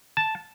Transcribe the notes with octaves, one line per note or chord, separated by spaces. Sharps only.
A5